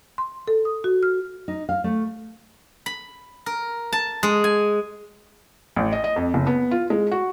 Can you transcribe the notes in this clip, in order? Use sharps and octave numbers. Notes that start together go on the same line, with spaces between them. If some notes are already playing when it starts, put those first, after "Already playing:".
C6
A4
D#6
F#4
F6
D#4
F5
A3
B5
A#4
A5
G#3
G#5
A1
D#5
D#5
F2
F#1
B3
F4
G#3
F#4